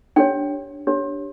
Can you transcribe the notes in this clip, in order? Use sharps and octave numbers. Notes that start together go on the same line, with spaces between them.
D4 G4 C#5 G5
D4 G4 C#5